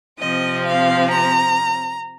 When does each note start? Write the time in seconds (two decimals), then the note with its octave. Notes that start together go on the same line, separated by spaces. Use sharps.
0.19 C3 F3 C4 D#5
0.66 F5
1.11 A#5